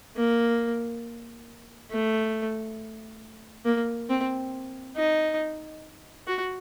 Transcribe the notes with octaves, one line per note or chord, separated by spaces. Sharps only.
A#3
A3
A#3
C4
D#4
F#4